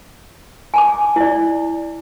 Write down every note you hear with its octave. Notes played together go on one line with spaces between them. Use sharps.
G#5 A5 D6
E4 D5